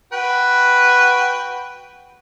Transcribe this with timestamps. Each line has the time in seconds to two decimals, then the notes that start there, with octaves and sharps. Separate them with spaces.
0.13 F#4 B4 G5